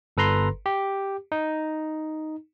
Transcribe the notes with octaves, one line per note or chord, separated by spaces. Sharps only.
G1 A4 B4 A#5 C6
G4
D#4